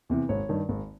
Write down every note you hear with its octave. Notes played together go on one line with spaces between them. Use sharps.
E2 C3 E3
G#1 C#5
G2 D#3
G#1